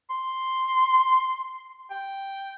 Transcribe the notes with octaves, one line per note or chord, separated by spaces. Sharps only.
C6
G5